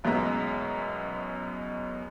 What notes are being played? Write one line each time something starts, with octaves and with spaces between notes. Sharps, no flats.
A1 F#2 B2 G#3 E5 A#5